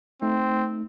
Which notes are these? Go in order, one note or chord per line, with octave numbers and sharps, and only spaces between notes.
A3 C4 D#4